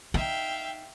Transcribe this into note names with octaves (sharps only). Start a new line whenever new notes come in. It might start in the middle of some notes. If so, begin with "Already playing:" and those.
D#4 E5 F5 G5